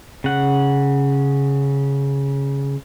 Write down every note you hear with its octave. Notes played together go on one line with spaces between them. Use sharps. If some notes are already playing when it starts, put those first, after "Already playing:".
C#3 F#5